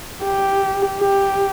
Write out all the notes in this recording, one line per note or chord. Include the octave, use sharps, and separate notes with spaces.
G4
G4